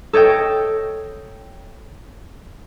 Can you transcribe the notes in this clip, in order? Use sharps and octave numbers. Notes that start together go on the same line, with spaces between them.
A4 C#5 D#5 G5